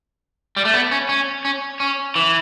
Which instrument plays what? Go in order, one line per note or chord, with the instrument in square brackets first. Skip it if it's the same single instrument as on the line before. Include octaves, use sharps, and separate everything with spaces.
[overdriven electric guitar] G3
A3
B3
C#4
C#4
C#4
C#4
E3